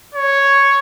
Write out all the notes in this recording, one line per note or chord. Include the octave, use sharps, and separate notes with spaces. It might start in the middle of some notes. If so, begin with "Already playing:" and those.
C#5